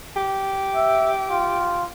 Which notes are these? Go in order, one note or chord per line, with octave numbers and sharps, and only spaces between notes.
G4
E5
F4